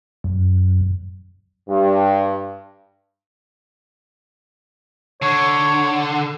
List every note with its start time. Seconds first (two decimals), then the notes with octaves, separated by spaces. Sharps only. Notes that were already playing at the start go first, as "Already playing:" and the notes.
0.24 F#2
1.68 G2
5.22 D3 C#5